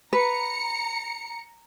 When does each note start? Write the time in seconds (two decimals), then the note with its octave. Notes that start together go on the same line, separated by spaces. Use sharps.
0.13 B4 A#5 C#7